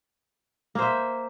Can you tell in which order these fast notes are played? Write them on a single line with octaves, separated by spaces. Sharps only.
A#3 C5 E5